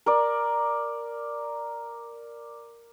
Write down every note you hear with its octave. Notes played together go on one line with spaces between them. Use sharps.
A#4 D5